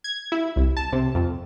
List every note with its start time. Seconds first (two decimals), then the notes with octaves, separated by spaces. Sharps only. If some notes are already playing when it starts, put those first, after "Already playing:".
0.04 G#6
0.32 E4
0.56 C2
0.77 A5
0.93 C3
1.15 F2